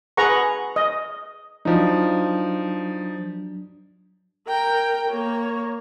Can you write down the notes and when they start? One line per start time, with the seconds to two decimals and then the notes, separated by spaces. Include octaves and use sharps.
0.17 G#4 B4 F#5 A#5 C#6
0.76 D#5
1.65 F3 F#3 D4 D#4
4.48 A#4 G5
5.10 A#3 C#5